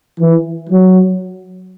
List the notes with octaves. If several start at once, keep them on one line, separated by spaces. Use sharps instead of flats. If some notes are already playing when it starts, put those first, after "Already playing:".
E3
F#3